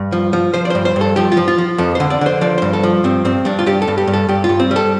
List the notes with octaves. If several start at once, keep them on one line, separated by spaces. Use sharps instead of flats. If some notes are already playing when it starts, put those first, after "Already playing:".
Already playing: G2
F3
F3
F3 C5
D5
G2 C5
C5
G2
A4
F3 G4
F4
F3
F4
F3
F2 A4
D3 C5
D5
D3 C5
F3 D5
G2 C5
A4
F3
G2 C4
G2 C4
G2 D4
F4
G2 G4
A4
G2
G4
G2
A4
G2 G4
F4
G2
C4
G3
A4